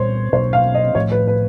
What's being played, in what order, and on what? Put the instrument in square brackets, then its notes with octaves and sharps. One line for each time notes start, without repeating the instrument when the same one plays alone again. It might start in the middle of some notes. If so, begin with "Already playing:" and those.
Already playing: [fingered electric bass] A#2 G3 B3 [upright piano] C5 C#5
[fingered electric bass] B2 F#3 A#3 D4 [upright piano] C5
[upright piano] F5
D#5
[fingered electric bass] A2 F3 A3 [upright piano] C#5
[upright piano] B4
B4